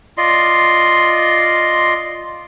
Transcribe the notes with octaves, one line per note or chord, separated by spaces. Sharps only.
F4 D5 D#5 C6